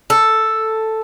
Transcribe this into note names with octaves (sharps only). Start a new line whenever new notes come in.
A4